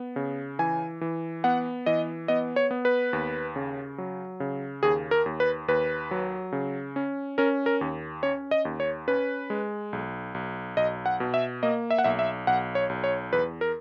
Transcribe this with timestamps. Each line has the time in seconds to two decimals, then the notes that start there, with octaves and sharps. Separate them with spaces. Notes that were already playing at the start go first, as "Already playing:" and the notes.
Already playing: B3
0.16 C#3
0.59 E3 G#5
1.01 E3
1.44 B3 F#5
1.86 E3 D#5
2.28 B3 D#5
2.56 C#5
2.71 B3
2.85 B4
3.13 D#2
3.56 C#3
3.98 F#3
4.40 C#3
4.83 D#2 G#4
5.11 A#4
5.26 D#2
5.40 B4
5.68 D#2 B4
6.11 F#3
6.52 C#3
6.96 C#4
7.38 C#4 A#4
7.66 A#4
7.81 D#2
8.23 C#4 C#5
8.51 D#5
8.65 D#2
8.80 C#5
9.08 C#4 B4
9.50 G#3
9.93 B1
10.35 B1
10.77 B1 D#5
11.06 F#5
11.20 B2
11.34 E5
11.63 A#3 D#5
11.90 E5
11.98 F#5
12.04 B1 E5
12.19 E5
12.47 B1 F#5
12.75 C#5
12.89 B1
13.04 C#5
13.32 E2 B4
13.61 A#4